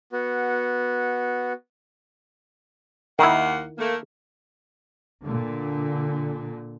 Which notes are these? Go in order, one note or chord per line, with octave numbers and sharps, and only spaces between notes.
B3 F#4
D#2 D#3 A#3 E4 F#5
A3 A#3
A#2 D3